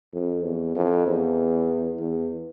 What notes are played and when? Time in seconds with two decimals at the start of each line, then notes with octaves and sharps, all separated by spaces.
0.14 F2
0.44 E2
0.75 F2
1.07 E2
1.99 E2